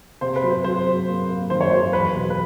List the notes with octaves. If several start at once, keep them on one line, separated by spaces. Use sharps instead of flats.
C3 C5
B4
F#3
C5
F#3 C5
F#3
A#3
A#3
D#3 C5
C#5
F#3 C5
E2 B4
B2
B4